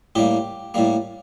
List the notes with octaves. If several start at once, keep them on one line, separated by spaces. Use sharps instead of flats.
A2 G3 A#3 G4
A2 G3 A#3